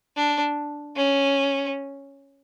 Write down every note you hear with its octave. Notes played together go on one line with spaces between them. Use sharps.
D4
C#4